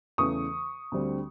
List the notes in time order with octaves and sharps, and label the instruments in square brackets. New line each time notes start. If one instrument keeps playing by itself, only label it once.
[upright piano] E2 C#3 E3 A3 C#6 D#6
D2 D3 G3 C4